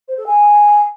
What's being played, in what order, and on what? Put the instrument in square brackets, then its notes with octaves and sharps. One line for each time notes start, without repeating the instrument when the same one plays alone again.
[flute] C5
A4
G#5